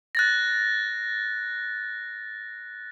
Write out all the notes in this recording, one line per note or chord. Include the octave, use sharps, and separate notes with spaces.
F#6 A6 A#6